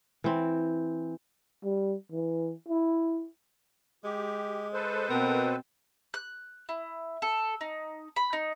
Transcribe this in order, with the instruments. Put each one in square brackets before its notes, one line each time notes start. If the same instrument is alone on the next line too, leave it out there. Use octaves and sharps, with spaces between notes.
[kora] E3 C4
[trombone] G3
E3
E4
[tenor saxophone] G#3 [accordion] G4
[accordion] A4 B4 C5
[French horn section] B2 B3 [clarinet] C4 [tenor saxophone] A#4
[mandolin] F#6
E4
A4
D#4
B5
D#4